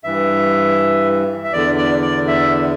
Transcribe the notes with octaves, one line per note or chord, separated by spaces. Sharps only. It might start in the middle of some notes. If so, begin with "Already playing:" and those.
G2 E3 E5
E5
E2 D3 D5
D5
D5
E5